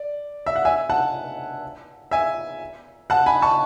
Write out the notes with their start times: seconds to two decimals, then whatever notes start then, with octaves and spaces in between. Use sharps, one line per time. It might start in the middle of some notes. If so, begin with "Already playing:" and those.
Already playing: D5
0.46 E5
0.56 F#5
0.65 E5 G#5
0.90 F#5 A5
2.11 E5 G#5
3.10 F#5 A5
3.26 G#5 B5
3.42 A5 C#6